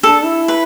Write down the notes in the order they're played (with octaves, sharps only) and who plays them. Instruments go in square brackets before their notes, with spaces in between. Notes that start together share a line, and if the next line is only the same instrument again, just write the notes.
[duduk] D4 [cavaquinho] A4
[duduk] E4
[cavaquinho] B4